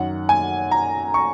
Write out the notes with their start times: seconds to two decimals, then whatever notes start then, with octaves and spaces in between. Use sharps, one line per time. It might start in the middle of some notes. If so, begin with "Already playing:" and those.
Already playing: F#2 D#3 F#3 F#5
0.29 G#5
0.71 A#5
1.14 C#6